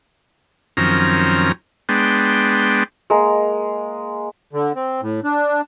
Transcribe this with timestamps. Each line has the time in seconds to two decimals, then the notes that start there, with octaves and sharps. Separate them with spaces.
0.77 F#2 D#3 F3 C4 C#4 A#5
1.89 G#3 B3 D4 G5 C6
3.10 G#3 A#3 A#4
4.53 D3
4.75 C4
5.02 A2
5.24 D4